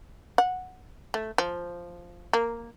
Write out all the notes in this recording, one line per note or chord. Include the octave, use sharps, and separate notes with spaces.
F#5
A3
F3
A#3